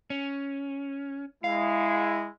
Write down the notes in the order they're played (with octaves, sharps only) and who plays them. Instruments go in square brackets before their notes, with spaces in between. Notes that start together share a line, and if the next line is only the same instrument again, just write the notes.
[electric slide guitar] C#4
[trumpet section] G#3 E4 [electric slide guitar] F5